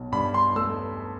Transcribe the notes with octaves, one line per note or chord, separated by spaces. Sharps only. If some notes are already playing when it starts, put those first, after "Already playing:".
Already playing: B1
G2 B5
C6
A3 E6